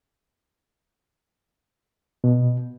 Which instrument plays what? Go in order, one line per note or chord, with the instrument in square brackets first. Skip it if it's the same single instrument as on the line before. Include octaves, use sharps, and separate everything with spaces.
[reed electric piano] B2